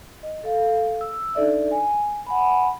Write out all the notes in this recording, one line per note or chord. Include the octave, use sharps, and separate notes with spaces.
D#5
A4 F5
E6
D4 D#4 A4 D5 E5
G#5
F#5 G#5 B5